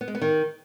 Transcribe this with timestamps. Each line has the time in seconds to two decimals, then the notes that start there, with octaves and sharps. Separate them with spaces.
0.01 B3
0.08 G#3
0.15 B3
0.21 D#3